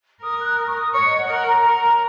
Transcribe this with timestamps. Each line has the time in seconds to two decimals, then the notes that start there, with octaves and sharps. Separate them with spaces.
0.22 A#4 D#6
0.40 F#6
0.58 D#6
0.67 C#6
0.75 D#6
0.93 C#5 C#6
1.05 D#5
1.17 F#5
1.28 A#4 F#5
1.47 A#5
1.65 A#4